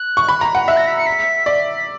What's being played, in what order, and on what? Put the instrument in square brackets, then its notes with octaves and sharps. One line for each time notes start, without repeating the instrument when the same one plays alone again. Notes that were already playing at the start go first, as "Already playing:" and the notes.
Already playing: [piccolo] F#6
[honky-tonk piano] C#6
B5
A#5
F#5
[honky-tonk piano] E5 [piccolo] F#6
[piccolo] A#6
B6
C#7
B6
[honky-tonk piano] D5
[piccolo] B6